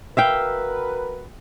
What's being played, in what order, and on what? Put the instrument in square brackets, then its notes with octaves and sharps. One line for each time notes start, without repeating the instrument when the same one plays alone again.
[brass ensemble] F#4 A#4 B4 [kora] E5 F5 G5